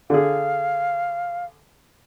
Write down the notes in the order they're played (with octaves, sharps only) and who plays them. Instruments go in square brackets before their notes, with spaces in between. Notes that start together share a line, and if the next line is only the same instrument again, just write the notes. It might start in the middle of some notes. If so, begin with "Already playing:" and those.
[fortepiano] D3 G#4 [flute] F5